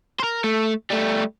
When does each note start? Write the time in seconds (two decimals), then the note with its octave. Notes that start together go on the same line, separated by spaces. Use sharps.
0.20 A#4 C5
0.44 A3
0.90 G3 A3